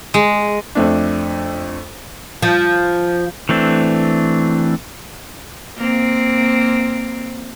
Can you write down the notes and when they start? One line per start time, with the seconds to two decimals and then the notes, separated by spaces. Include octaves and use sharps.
0.14 G#3
0.75 F2 A3 D4
2.42 F3
3.49 E3 A3 C4 D4
5.77 A#3 C4